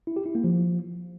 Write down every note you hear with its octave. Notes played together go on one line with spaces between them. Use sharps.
E4
G4
E4
A#3
F3